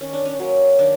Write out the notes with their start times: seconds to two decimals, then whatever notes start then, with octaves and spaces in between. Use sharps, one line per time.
0.01 D#3 C#4
0.13 D4
0.25 C#4
0.40 F#3 A#3 C#4
0.79 D#3 D4